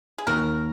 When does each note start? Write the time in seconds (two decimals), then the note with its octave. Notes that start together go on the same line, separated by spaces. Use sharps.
0.18 G#4
0.27 D#2 F#4 A#4